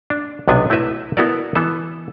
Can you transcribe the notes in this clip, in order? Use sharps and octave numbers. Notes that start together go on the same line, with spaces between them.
D4
B1 C3 B3 D4 G#5
A3 E4 F#4 B4 E5
B3 E4 F#4 A4 A#4 D5
E3 B3 A4